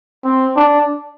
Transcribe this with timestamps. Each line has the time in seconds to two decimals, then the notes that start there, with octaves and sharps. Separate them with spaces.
0.24 C4
0.57 D4